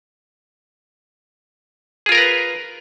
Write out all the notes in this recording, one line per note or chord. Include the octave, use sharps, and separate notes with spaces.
F4 G#4 A#4 B4 A#5